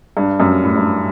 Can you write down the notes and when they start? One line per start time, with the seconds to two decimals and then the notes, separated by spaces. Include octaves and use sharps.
0.17 G2
0.40 F#2
0.64 A2
0.76 G2